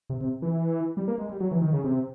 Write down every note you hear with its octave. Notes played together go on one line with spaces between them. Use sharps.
C3
C3
E3
G3
A#3
G#3
G3
F#3
E3
D#3
C#3
C3